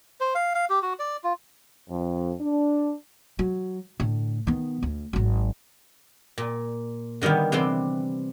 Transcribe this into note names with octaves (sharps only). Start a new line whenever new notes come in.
C5
F5
F5
G4
F#4
D5
F4
F2
D4
F#3
A2 D3
D#3 B3
D2
G#1 F#3
A#2
D3 D#3 G3 A#3 B3
C3 E3 B4 D5 C6